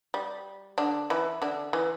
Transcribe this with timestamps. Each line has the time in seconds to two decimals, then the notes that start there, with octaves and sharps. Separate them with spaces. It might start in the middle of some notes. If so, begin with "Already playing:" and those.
0.14 G3
0.78 D3 D4
1.10 E3 E4
1.42 D3 D4
1.73 E3